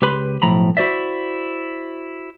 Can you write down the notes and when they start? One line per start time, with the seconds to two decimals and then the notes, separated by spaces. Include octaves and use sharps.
0.02 C#2 G4 B4 B5 C6
0.42 B1 A2 F3 A#5 B5
0.77 E4 F#4 C5 D5 E5